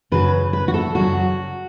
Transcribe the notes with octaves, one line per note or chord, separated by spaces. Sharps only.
F#2 C#3 F#3 B4
B4
F#4
A4
F#2 C#3 F#3 F#4